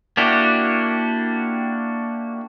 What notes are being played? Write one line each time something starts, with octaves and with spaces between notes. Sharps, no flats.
A#3 D4 E4 F#4 G4